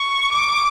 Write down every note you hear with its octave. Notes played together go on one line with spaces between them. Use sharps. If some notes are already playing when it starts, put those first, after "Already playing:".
Already playing: C#6
D6